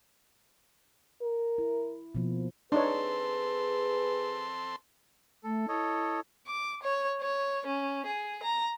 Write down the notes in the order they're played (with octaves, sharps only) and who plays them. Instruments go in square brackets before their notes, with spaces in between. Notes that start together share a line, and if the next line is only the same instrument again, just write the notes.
[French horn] A#4
[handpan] E4
B2 F3 A#3
[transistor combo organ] C4 A4 C6 [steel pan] D4 D#4 C#5 [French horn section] G#4 B4
[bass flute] A3 [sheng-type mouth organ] A4
[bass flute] E4 [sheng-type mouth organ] A4 C#5 D#5
[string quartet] D6
C#5
C#5
C#4
G#4
A#5